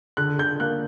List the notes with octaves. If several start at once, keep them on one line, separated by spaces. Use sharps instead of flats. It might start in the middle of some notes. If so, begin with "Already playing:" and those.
D3 F#6
D3 G6
A#3 F#6